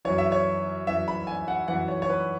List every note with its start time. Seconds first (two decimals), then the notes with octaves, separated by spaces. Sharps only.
0.05 F#2 E3 C#5
0.18 E5
0.32 C#5
0.87 F#2 E3 E5
1.08 B5
1.27 G#5
1.48 F#5
1.68 F#2 E3 F#5
1.88 C#5
2.02 C#5
2.10 B4